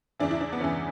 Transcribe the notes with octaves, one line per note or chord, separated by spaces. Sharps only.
E2 C#3 E3 D4
E4
D4
B3
E2 C#3 E3 C#4